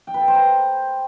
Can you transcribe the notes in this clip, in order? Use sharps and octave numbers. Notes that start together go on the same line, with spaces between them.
G5
B4
A4
C5
A#5